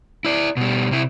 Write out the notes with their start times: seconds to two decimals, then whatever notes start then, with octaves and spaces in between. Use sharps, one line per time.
0.25 E4 D5
0.57 B2 G3
0.91 C3 E4